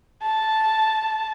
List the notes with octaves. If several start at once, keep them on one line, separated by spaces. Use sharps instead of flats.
A5